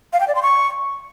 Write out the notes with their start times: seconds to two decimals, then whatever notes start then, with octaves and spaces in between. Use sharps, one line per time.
0.13 F5
0.20 G5
0.28 D5
0.35 C6
0.43 C#6